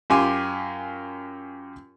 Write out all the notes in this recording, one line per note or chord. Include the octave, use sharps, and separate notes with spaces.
F#2 F4 G4 G#5 C6